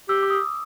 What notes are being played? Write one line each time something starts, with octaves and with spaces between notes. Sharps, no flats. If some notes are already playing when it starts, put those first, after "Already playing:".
G4 E6
D6
D#6